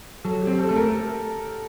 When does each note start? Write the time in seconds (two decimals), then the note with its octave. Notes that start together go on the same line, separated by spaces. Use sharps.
0.24 F#3 A4
0.42 G4
0.47 C4
0.59 A4
0.69 A3 A4
0.76 A#4
0.88 A#4